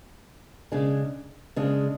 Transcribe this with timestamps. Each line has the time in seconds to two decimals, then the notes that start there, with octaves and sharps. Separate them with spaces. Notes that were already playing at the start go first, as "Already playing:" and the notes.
0.72 C#3 G#3 D4 G#4
1.56 C#3 G#3 D4 G#4